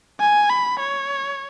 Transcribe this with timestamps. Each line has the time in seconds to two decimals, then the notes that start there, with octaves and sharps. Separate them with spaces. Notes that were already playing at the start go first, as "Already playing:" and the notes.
0.20 G#5
0.50 B5
0.80 C#5